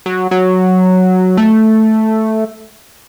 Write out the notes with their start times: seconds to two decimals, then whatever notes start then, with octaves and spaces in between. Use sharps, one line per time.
0.06 F#3
0.31 F#3
1.37 A3